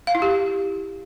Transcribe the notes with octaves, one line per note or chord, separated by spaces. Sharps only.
F5
E4
G4